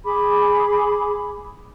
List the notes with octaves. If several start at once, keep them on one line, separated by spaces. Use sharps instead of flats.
G#4 B5 D6